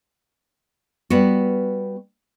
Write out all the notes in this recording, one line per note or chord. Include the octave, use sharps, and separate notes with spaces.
G3 B3 F#4